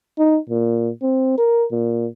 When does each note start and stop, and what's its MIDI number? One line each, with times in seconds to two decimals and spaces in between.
0.19 0.38 63
0.50 0.90 46
1.02 1.38 60
1.38 1.66 70
1.72 2.07 46